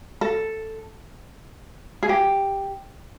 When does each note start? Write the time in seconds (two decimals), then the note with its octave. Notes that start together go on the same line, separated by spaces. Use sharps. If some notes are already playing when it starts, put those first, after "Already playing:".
0.21 A4
2.03 G#4
2.09 G4